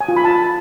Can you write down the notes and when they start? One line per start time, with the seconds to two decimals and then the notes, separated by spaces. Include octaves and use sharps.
0.01 G#5
0.09 F4
0.16 B5
0.24 A5